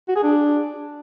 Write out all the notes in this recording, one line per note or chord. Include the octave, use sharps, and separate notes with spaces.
F#4
G#4
D4